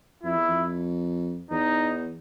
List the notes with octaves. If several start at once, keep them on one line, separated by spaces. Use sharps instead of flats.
F2 E4
E2
F2
E2 D#4